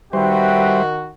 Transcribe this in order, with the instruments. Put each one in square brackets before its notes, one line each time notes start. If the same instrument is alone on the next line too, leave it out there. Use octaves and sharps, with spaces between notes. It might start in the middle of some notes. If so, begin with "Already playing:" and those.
[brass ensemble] D#3 F#4 [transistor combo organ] G3 C5 [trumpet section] C4 B4 G5 [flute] E5